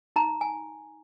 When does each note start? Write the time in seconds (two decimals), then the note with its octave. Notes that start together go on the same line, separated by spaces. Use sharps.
0.16 D#4 A#5
0.41 G#5